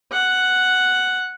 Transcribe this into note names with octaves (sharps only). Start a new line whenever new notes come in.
F#5